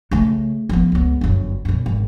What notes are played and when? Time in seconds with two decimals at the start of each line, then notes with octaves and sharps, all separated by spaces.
0.11 C#3 A3
0.69 F3 B3
0.92 C#2 B3
1.21 G1 F#2
1.65 F#2 B2
1.86 G#1